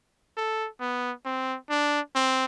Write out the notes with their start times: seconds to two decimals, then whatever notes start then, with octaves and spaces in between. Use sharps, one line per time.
0.37 A4
0.81 B3
1.25 C4
1.70 D4
2.15 C4